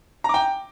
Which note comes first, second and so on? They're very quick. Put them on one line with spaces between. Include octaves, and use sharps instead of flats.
A#5 D6 G5